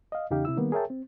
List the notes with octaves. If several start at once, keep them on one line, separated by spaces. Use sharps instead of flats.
D#5 F5
E2 C#3 D#4 G4 F5 G5
C3 E4 E6
D#3 G3 A#3 B3
G#4 A#4 C#5 E5 G5 A5
C4